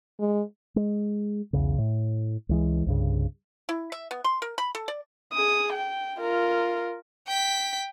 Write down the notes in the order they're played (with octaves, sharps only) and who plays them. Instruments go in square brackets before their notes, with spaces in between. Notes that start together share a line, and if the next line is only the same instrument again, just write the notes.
[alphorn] G#3
[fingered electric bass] G#3
B1 E2 C#3
A2
C#2 E3 G#3
C2 G2 C#3
[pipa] E4
E5
B3
C6
A#4
B5
A4
D5
[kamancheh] G#4 D#6
G5
F4 A#4
[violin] G5 B6